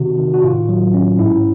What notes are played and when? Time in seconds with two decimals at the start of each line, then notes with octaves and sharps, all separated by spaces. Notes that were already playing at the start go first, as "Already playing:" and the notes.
Already playing: C3 D#3 F#4
0.18 D#3
0.34 F#4
0.43 A2 F4
0.69 F#3
0.94 C#4
1.19 G#2 E4